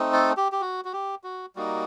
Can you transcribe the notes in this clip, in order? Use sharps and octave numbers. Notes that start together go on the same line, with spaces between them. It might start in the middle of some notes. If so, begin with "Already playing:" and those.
Already playing: A3 C4 D#4
A4
G4
G4
F#4
F#4
G4
F#4
G3 A#3 D#4 F#4